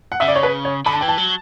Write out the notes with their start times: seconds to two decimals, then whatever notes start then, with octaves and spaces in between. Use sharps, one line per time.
0.12 F#5
0.20 C#3 E5
0.28 D5
0.35 C#5
0.43 B4
0.65 C#5
0.86 D3 B5
0.93 A5
1.01 E3 G5
1.08 A5
1.18 F#3